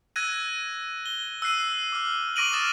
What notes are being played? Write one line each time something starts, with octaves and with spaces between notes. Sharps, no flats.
E6 F#6 G#6 A#6 D#7
G7
E6 F#6 C7 D#7
D6 F6
C#6 D6 A#6 D7 D#7 F#7
D6 D#6 F6 A6 E7 F#7